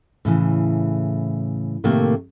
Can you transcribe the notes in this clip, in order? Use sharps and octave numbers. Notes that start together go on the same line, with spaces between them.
A2 C#3 E3
A2 C3 D#3 A3 A#3